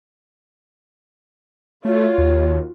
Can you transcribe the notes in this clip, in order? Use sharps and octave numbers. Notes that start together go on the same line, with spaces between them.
A3 F4 F#4 C#5
D#2